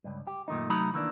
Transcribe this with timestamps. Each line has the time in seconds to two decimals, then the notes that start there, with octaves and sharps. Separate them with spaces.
0.04 C#2 G2
0.27 G4
0.48 F#2 A#2 D#3 A3 D#4
0.70 C3 F#3 A3 D#4 A#5 B5
0.94 D#3 E3 A#3 D4